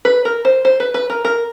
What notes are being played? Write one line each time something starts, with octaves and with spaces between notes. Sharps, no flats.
B4
A#4
C5
C5
B4
B4
A#4
A#4